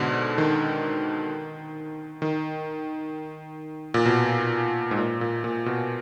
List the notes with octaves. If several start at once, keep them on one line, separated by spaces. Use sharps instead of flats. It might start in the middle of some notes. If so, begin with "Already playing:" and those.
Already playing: G#2 B2 D3
D#3
D#3
A#2
B2
G#2
A#2
A#2
A#2
B2